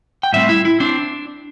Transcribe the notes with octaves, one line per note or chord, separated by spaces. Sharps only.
G5
A2 G3 C4 E5
E4
E4
C4 D4